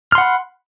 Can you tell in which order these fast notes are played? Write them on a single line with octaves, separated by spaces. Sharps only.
F6 C6 F#5 B5